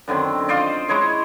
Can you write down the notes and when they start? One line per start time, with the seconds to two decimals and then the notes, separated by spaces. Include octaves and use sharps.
0.08 F#2 D3 D#3 C4
0.48 F4 C5 D5 D#5
0.89 G#3 E4 C#5 D#5